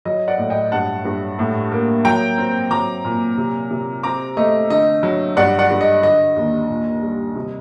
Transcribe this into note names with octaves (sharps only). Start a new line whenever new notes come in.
F#3 D#5
D5 F#5
A2
D#5 G5
G2 F#5 A5
G2
A2
A#3
F#3 G5 A#5
C4
F#3 A#5 D6
A#2
C3
C3
C4 A#5 D6
A3 D#5
D3 D#5
F#3
G2 D5 F#5
D5 F#5
G2
D#5
D3 D#5
D#2
A#2
G3
C3